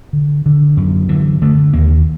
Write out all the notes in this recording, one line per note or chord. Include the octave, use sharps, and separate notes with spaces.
D3
D3
F#2
D3 E3
D3 A3
D#2 A#3